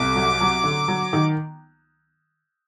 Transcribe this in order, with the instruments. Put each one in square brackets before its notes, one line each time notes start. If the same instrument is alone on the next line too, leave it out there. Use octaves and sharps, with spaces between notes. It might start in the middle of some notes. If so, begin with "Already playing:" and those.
Already playing: [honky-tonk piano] C2 A3 [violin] D6
[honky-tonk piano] F#3
F#3
D3
F#3
D#3